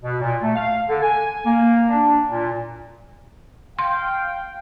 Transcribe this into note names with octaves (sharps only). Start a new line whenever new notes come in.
B2
A#2
A3
F5
D3
G#5
A#3
D4
A#2
F5 G5 C6